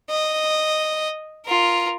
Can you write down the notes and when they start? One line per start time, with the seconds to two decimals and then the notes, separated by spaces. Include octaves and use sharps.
0.10 D#5
1.46 F4 A#4